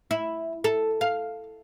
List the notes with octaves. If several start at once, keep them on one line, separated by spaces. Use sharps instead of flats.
E4
A4
F5